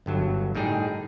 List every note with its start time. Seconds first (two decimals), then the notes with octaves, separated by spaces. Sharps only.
0.06 G1 G2 F#3
0.55 A2 G3 D#4 G#4